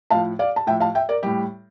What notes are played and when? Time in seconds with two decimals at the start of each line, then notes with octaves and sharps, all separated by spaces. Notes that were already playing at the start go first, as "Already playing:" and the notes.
0.10 A2 F3 F5 A5
0.39 D5 F5
0.56 A5
0.67 A2 E5 G5
0.70 F3
0.80 F5 A5
0.95 E5 G5
1.09 A#4 D5
1.23 A2 G3 G4